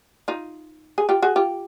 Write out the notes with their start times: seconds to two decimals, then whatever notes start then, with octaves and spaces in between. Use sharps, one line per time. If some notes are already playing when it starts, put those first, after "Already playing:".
0.28 D#4 F4
0.98 G#4
1.09 F4 G4
1.22 F#4 G#4
1.36 F4 G4